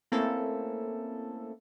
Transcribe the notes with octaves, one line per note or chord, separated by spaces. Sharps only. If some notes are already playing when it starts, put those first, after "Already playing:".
A3 A#3 C4 C#4 E4 A4